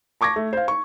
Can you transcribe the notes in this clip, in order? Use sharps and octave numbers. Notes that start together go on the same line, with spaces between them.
A5 C#6 D6 G#6 A#6
A3
C5 F5
C#6